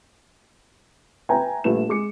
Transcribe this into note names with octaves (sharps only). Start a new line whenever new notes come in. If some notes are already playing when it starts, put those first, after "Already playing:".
B4 E5 G5 G#5 A#5
A#1 G3 A3 B4 E7
G#3 D6 C#7